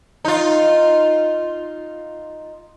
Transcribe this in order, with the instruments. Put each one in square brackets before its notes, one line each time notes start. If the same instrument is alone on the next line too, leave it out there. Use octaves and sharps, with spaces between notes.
[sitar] D#4 F4